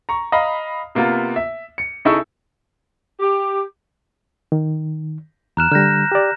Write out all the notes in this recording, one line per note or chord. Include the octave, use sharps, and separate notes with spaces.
A#5 C#6
D#5 F5 A#5 B5
C3 A#3 B3 F4
E5
C#7
C#3 D#4 E4 A4 C#6 E6
G4
D#3
E2 A#5 F6 F#6 E7
D3 G3 F6 G6 A#6
G4 D5